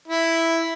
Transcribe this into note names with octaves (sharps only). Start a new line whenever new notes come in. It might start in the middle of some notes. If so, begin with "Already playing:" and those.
E4